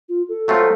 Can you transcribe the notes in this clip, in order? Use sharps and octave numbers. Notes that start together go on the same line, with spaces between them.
F4
A4
F#3 A3 C4 F4